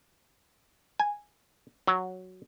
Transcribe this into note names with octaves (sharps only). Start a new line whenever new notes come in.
G#5
F#3